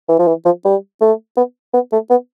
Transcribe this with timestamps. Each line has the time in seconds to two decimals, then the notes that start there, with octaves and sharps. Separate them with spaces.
0.09 E3
0.19 F3
0.28 E3
0.45 F3
0.65 G3
1.01 A3
1.37 B3
1.74 B3
1.93 A3
2.10 B3